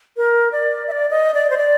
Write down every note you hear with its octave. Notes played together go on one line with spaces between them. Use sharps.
A#4
D5
E5
D5
D#5
D5
C5
D5